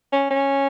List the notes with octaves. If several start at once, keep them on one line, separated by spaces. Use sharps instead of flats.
C#4
C#4